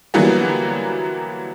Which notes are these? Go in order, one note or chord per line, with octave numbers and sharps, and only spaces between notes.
D3 E3 F#3 G3 A#3 B3